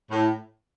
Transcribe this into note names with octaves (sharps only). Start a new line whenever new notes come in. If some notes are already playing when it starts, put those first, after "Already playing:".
A2